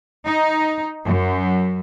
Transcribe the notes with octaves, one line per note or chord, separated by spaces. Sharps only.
D#4
F#2